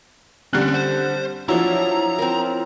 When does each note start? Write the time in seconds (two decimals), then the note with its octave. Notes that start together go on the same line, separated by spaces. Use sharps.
0.53 D3 G3 C4 C#4 F#6
0.74 C5
1.49 F3 F#3 D4 E4 A#5
2.19 C4 A#4